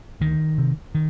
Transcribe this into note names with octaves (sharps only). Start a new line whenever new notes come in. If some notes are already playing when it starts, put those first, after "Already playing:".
D2 D#3
C3
D#3